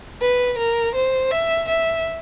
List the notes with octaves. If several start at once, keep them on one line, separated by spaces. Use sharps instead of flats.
B4
A#4
C5
E5
E5